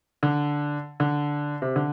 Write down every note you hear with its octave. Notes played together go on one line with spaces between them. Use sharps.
D3
D3
C3
D3